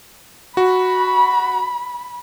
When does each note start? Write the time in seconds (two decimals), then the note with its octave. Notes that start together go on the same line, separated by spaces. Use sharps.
0.57 F#4 B5